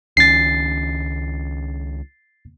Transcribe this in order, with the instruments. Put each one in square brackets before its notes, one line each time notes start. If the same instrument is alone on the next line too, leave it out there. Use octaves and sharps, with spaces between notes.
[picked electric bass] C#2 D#3 C#4 [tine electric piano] A6 C7